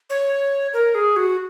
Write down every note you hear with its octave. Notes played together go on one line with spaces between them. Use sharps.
C#5
A#4
G#4
F#4